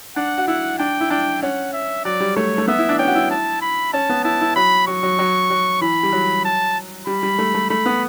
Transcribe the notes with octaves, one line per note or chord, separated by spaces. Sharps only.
D4 F#5
F#4
E4 F#5
D4 G5
E4
D4 G5
C#4 F#5
E5
F#3 D5
G3
A3 C#5
A3
B3 E5
E4
D4
C#4 G5
F#4
E4
A5
B5
C#4 A5
B3
E4 A5
E4
F#3 B5
F#3 C#6
F#3
F#3
F#3
E3 B5
G3
F#3
A5
G3 B5
G3
A3
A3
A3 B5
B3